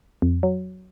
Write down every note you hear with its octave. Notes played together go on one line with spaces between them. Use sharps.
F2
F#3